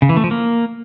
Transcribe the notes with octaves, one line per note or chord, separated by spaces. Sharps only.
C#3
E3
A3
F3
A#3